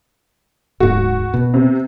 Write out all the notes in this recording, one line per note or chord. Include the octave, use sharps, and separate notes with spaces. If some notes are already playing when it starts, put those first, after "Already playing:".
D1 G#2 F#4
B2
C3